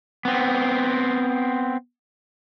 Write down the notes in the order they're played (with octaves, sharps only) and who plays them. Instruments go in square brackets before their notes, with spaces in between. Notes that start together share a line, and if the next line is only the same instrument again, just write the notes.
[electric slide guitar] B3 C4